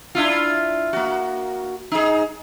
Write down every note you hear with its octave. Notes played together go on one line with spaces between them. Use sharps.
D4 E4 F4
A#3 F#4
D#4 G#4